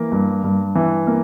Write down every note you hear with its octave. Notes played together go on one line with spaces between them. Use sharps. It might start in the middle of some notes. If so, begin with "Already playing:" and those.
Already playing: E3 A#3
G2
G2
E3
A#3